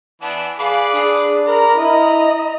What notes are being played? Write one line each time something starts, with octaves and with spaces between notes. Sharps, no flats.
E3 B3 D4 A5
G#4 B4 D5 F5
D4 G#4
A#4 A#5 B5
E4 D#5